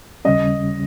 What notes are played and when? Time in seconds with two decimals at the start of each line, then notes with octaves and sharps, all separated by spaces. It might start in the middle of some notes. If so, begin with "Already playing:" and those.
0.25 D#2 C#3 G3 C#4 D#5